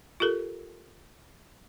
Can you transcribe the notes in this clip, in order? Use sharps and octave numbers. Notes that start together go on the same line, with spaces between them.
F4 G4 A4 A#4